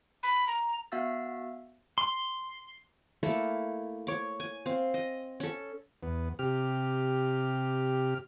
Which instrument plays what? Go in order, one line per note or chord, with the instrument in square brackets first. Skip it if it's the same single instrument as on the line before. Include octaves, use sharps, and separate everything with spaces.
[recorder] B5
A#5
[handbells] B3 F#4 E5 F5 E6 A6
[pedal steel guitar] C6
[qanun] A3 A#3 E4 A4
C#5 D6
G#5
C4 F5
D#5
C#4 A4
[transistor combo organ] E2 B3
C3 G4 F6